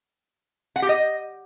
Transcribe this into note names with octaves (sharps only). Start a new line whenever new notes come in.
F#5
G4
D#5